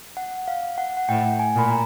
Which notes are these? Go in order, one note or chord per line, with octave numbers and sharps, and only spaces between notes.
F#5
F5
F#5
F#5
A2 G5
G#5
A#2 B5
A#5